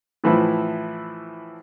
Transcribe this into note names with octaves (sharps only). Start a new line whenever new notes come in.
A2 E3 F3 E4